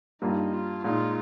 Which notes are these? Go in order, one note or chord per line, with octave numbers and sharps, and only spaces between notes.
G2 G3 A#3 D#4 F4
F4
A#2 G#3 D#4 F4